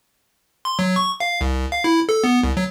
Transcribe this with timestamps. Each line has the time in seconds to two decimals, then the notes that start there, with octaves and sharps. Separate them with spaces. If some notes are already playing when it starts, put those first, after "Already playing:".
0.65 C6
0.79 F#3
0.96 C#6
1.20 F5
1.41 C2
1.72 F5
1.84 E4
2.09 A4
2.24 B3
2.43 C2
2.57 F#3